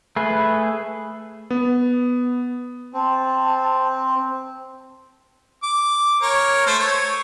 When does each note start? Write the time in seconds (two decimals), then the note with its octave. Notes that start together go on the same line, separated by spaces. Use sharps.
0.16 A3 G#4 B4
1.50 B3
2.93 C4 A5
5.63 D6
6.22 A#4 C#5
6.67 A3 C5
6.80 C#5